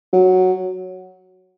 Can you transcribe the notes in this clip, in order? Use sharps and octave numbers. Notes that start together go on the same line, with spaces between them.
F#3